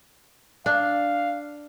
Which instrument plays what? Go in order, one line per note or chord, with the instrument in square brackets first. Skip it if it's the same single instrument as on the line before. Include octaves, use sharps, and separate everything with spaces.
[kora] D4 [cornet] F5